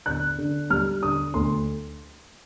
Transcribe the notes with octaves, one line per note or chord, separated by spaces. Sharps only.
D3 F#6
D3
G3 F6
D3 D#6
D2 C6